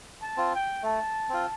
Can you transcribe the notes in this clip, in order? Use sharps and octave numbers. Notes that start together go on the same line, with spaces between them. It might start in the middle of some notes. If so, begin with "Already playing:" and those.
A5
C4 F4
G5
A3 A5
C4 F4